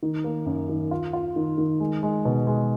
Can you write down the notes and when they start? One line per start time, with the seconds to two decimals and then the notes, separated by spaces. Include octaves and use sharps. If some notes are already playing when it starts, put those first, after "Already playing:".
0.03 D#3
0.24 A#3
0.46 F#2
0.69 D#3
0.91 F4
1.13 F4
1.36 D#3
1.58 D#3
1.80 G#3
2.03 G#3
2.25 B2
2.47 G#3